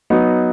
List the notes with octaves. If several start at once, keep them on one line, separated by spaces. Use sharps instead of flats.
F#3 B3 D#4